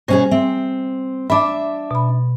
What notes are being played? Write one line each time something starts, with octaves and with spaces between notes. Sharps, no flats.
B2 G3 C#4 G#4 C5
C4 E5
D4 E5 B5 D6
B2 B5